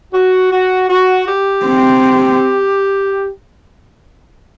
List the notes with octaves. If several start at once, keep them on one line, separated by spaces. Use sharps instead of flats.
F#4
F#4
F#4
G4
C4